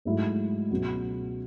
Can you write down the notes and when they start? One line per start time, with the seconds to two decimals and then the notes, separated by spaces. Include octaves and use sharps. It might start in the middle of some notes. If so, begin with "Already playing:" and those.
0.05 G#2 F#3 A3 E4
0.71 C#2 B2 F#3